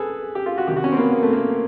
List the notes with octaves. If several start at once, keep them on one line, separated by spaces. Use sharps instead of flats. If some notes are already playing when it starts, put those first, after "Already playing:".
Already playing: G#4 A4 B4
G4
F4
F#4
C3 D#3 G4
F#4
C#4
C4
A#3
B3
A#3
A3
A#3